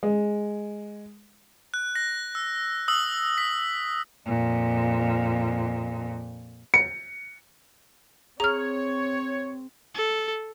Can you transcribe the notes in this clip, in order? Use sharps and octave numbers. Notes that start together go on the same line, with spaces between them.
G#3
F#6
A#6
E6
D#6 E6 F#7
B6
F2 A#2
C#7
C4 G#4 C#5 A#5 F6
A4